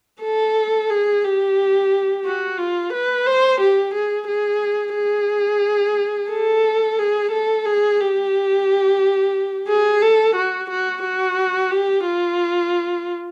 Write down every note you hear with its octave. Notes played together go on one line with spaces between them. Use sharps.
A4
G#4
G4
F#4
F4
B4
C5
G4
G#4
G#4
G#4
A4
G#4
A4
G#4
G4
G#4
A4
F#4
F#4
F#4
G4
F4